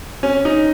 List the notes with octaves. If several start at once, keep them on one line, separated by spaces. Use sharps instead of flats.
C#4
D#4